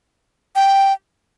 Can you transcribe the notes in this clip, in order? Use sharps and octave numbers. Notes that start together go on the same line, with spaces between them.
G5